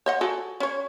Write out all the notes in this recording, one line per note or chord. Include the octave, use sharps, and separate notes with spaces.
C5 D#5 F#5
F#4 G#4 A4
C#4 C#5